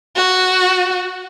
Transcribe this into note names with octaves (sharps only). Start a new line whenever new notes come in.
F#4